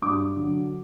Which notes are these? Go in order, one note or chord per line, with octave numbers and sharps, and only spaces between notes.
G2 D6
D3 F#3